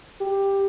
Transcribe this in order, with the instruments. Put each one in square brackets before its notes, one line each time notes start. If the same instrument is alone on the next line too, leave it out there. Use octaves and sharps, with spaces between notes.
[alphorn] G4